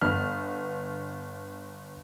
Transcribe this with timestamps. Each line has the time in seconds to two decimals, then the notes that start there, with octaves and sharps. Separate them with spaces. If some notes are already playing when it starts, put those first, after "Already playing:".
0.01 G1 B3 F6